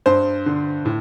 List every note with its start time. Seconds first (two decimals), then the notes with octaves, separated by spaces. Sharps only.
0.06 G2 C5
0.46 D3
0.85 A2